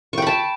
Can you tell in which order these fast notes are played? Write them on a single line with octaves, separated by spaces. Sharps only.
C#6 G5 B5 A5